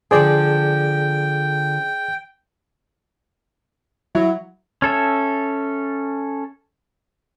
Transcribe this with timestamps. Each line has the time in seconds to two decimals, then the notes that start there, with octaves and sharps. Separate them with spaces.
0.11 D3 F3 D4 G#4 C5 D5 G5
4.15 F#3 E4
4.82 C#4 A4 E5